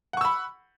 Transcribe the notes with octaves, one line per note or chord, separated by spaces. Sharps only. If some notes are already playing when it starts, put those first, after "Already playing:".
F#5 B5 C#6 E6